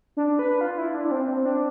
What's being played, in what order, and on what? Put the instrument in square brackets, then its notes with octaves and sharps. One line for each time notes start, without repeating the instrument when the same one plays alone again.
[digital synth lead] D4
B4
F4
E4
D4
D4
C4
C4
D4